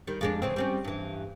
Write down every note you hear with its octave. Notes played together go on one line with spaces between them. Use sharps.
D#3 G3
F2 G#3 D4
C#3 E3 C4
G3 C4 C#4
G2 E3